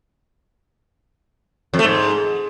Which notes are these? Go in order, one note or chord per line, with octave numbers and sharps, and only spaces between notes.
F2
A3
G#2